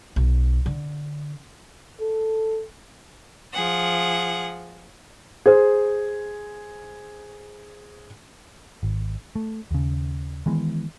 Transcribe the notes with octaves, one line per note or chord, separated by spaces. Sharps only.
B1
D3
A4
F3 G#4 F#5
G#4 C5
G#1
A3
D#2 C#3
D#3 E3 G#3 B3